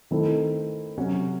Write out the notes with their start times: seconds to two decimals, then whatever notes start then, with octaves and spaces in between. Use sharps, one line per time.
0.11 D#3 A3 C4 E4
0.98 C3 F#3 C#4 F#4